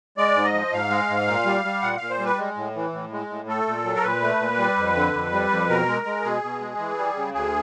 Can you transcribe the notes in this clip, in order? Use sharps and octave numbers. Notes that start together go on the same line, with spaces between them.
G#3 D5
G#2
D#5
F3
G#2 F5
G#3
G#2
A#2
G3
G3
A#2 F#5
A#2 F5
C5
G3
B4
G#3
A2
E3
A2
G#3
A2
A3 A4
A#2
F#3
A#4
A#2 B4
A3
A#2
G3
F2
D3
F2
G3
F2
B2 A#4
G#3
G#3
B2 G#4
B2
G#3
E3
G3
C#3
D2 G#4